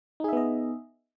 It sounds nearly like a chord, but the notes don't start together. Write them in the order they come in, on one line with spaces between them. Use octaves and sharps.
D#4 G#4 E5 B3 D#5